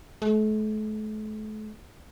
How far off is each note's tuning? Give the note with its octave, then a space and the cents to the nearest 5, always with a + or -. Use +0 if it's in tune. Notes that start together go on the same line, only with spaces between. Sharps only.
A3 -40